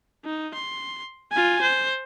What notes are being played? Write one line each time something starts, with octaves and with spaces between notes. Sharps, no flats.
D#4
C6
F4 G#5
C5